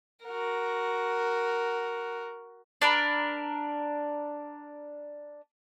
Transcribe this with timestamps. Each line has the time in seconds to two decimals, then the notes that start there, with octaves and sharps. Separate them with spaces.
0.25 F#4 A#4
2.82 D4 A#4 B5